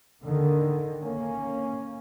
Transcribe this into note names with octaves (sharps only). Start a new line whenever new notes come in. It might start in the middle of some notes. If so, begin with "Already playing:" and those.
D#2 D3 D#3
A#3 C#4